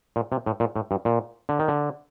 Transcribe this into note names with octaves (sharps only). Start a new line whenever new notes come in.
A#2
C3
A2
A#2
A2
G2
A#2
D3
D#3
D3